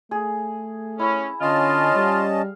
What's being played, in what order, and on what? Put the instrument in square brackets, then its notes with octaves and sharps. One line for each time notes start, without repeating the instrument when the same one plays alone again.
[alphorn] A3 [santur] G#4
[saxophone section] C#4 [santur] E4
[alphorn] D3 [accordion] C#4 D#5 A5 [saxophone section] F4
[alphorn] G3 [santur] F5